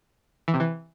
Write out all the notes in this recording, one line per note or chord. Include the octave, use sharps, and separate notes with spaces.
E3
C3
E3